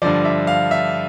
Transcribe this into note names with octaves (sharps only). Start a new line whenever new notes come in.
G2 D3 F3 D5
E5
F5
E5